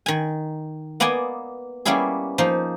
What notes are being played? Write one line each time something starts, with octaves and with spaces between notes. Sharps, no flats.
D#3 G#5
A#3 B3 D5 D#5 G#5
G3 A#3 B3 C#4 E4 G#4
F3 A#3 D#4